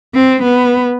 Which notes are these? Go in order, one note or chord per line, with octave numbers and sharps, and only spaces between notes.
C4
B3